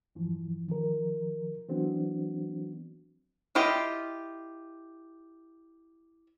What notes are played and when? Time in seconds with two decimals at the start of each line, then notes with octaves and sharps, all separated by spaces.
0.15 E2 G2 E3 F3
0.68 D#3 F3 A#4
1.69 E3 F#3 B3 C4 D4 F#4
3.55 E4 F4 G4 D#5